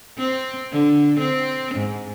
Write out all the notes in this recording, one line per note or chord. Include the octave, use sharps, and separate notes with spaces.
C4
D3
C4
G#2